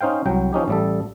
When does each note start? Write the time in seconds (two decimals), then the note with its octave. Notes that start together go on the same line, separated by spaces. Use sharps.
0.01 C#4 D#4 C5 F5 G5
0.26 C2 F#3 G5
0.53 F3 C#4 D#4 G4
0.68 A1 G3 A4